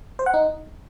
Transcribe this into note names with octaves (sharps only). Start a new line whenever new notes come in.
C5
F#5
D#4